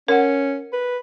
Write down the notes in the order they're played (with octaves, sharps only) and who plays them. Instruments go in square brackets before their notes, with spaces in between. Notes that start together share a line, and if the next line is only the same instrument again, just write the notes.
[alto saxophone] C#4 [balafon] A#4 F#5
[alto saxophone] B4